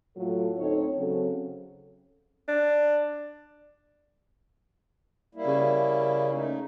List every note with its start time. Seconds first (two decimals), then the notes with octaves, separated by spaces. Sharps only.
0.16 A2 F#3 F4 A4
0.58 D2 C4 D#4 A4 C#5
0.98 C#3 F#3 C4 C#4 A4
2.48 D4
5.35 G3 A#3 E4
5.47 C#3
6.33 A3 D#4